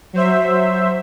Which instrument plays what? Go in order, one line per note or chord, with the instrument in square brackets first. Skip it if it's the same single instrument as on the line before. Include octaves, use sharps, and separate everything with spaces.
[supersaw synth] F#3 C5 E5